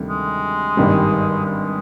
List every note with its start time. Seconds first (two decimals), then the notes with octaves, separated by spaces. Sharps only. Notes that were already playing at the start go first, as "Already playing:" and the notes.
Already playing: D2 C3 D#3 G3
0.08 G#3
0.77 G#1 G2 D#3 G3
1.46 G#3